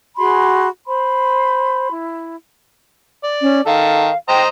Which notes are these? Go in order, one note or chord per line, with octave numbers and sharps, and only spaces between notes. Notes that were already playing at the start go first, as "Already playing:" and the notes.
F#4 G#4 B5 C6
C5 B5 C6
E4
D5
C#4
D#3 A4 F5
C5 D#5 G5 A#5